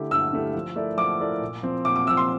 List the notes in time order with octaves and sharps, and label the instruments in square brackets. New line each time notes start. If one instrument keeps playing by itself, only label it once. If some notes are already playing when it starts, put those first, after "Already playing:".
Already playing: [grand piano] D3 A3 E4 G4
[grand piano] G2 [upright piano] E6
[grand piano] D3 A3 E4 G4
F3
A3 E4 A#4 D5
[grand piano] F3 [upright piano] D6
[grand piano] A3 E4 A#4 D5
A#2
F3 C4
[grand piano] A#2 [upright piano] D6
[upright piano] D6
[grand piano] F3 C4 [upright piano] E6
[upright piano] C6